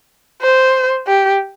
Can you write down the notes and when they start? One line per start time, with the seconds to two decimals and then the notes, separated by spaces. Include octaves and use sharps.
0.42 C5
1.07 G4